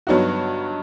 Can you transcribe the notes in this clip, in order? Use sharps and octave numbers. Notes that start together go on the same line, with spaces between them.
G2 F#3 B3 D#4 F#4